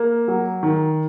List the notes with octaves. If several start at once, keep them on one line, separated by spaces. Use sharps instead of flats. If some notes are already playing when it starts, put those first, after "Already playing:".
Already playing: A#3
F#3
D#3